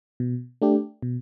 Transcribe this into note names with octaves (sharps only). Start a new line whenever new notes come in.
B2
A3 D4 G4
B2